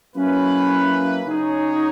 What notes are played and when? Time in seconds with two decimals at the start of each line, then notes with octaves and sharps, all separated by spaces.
0.15 F#3 A#3 C#4 E4 B4
1.26 C#3 F#3 C#4 D#4 G#4 C#5